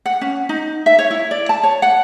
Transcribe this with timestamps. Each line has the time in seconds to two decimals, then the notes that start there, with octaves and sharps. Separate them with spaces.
0.06 F#5
0.21 C#4
0.49 D#4
0.86 E5
0.99 C#5
1.11 E4
1.31 D5
1.49 A5
1.63 C#5
1.82 F#5